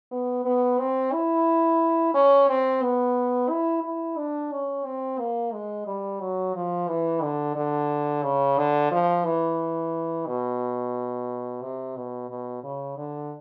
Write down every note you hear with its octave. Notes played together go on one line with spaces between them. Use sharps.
B3
B3
C4
E4
C#4
C4
B3
E4
E4
D4
C#4
C4
A#3
G#3
G3
F#3
F3
E3
D3
D3
C#3
D3
F3
E3
B2
C3
B2
B2
C#3
D3